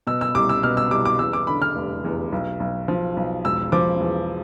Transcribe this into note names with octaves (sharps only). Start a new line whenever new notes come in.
B2 E6
E6
C2 D6
E6
B2 F6
E6
C2 D6
D6
E2 E6
D6
D3 B5
F6
F1
E2
B1
B1
F3
B1
E1 E6
F3 D6
E2